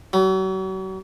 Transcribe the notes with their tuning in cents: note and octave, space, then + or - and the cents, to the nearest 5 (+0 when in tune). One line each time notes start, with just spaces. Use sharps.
F#3 +40